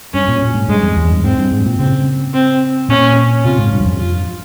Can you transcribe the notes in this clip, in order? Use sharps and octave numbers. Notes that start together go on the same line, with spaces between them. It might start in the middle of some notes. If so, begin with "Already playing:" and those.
G2 C#4
A#2
A#2
G#2
G2 G#3
F2
E2
G2
G#2 C4
G2
G#2
A#2
C#3 C4
C4
A#2 C#4
C3 F4
G#2
G2
E2
F2
F4